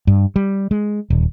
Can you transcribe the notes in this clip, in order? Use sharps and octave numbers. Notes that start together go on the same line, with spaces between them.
G2
G3
G#3
D#1